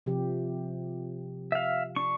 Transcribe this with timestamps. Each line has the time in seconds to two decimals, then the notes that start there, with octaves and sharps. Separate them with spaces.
0.06 C3 F3 G4
1.52 E5 F5
1.96 D4 C#6